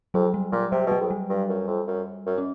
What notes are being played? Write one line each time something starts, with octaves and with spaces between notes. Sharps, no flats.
F2 F#3
G3
A#2 F#3
C3 F#3
B2 F#3
F2
G3
G2
F#2
F2
F#2
F#2
C#4